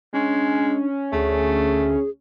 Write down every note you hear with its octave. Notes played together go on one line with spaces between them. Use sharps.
G#3 C#4 D4
D2 A3 G#4